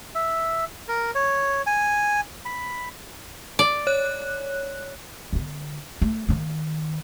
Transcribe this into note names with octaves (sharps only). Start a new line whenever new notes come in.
E5
A#4
C#5
G#5
B5
D5
C#5 F#6
D3 B3
A3
D#3 A#3